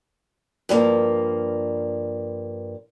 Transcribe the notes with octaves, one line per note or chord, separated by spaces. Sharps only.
G2 F3 A#3